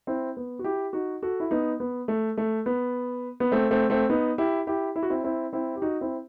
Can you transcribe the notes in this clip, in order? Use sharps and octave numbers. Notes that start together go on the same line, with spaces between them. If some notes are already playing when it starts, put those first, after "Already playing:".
C4 E4
B3
F#4
E4 G4
D#4 F#4
F#4 A4
E4
B3 D#4
B3
A3
A3
B3
B3
A3 C4
A3 C4
A3 C4
B3 D#4
E4 G4
E4 G4
E4
F#4
C4 E4
C4 E4
C4 E4
G4
D#4 F#4
C4 E4